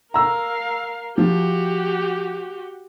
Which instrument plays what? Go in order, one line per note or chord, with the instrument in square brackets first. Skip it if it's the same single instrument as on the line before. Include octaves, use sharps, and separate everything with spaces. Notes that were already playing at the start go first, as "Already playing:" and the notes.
[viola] A#4 F5 [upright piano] A#5 E6
[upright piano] F3 [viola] F#4 G4